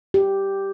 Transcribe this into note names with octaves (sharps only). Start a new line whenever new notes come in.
G4